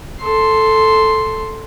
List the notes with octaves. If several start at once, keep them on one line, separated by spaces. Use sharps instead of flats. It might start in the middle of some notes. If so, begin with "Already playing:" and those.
A4 C6